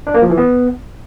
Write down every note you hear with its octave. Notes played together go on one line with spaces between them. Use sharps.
D4
A#3
F3
E3
B3